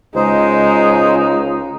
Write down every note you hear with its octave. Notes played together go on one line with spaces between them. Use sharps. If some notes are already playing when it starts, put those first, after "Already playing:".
C#2 G#3 D#4 C5